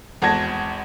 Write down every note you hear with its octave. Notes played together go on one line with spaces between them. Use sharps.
G#1 E2 F#5 A5 G#6 A#6